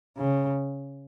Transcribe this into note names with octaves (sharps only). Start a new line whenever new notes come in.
C#3